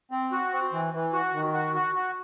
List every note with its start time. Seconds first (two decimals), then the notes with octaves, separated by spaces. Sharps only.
0.11 C4
0.32 F#4
0.53 C4
0.73 E3
0.93 E3
1.13 F#4
1.33 D#3
1.54 F#4
1.75 F#4
1.95 F#4